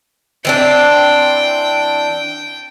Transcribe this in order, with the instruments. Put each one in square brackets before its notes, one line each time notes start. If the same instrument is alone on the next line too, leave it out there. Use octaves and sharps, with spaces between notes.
[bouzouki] E3 C4 D4 [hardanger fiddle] G5